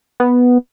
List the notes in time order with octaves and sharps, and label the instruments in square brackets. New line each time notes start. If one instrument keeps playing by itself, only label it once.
[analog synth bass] B3